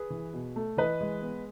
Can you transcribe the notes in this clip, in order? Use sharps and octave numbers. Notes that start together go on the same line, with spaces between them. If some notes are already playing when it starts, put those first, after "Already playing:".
Already playing: G#4 B4
E3
B2
A3
E3 B4 D#5
G#3
B3